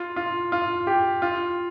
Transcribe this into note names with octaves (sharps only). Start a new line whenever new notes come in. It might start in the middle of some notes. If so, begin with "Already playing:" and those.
Already playing: F4
F4
F4
G4
F4